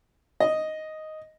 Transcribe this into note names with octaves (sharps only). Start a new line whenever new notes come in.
D#5